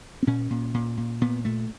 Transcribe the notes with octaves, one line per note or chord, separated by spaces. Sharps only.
C4
A#2 C#4
A#2
A#2
A#2
A#2 B3
A#2 A3